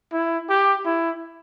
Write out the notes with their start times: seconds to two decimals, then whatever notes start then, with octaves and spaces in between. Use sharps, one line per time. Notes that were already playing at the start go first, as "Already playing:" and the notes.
0.13 E4
0.49 G4
0.85 E4